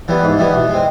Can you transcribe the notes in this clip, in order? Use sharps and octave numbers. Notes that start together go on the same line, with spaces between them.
E3 G3 B3 E4
G#2
E3 G3 B3 E4
B2
G#3 C4